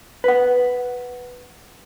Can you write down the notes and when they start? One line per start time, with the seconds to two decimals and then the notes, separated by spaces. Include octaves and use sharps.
0.24 B4 F#5